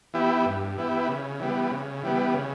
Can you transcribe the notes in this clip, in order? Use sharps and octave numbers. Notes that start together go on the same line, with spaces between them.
E3 B3 E4 G4
G2
E3 B3 E4 G4
C#3
E3 G3 B3
C#3
E3 G3 B3
C#3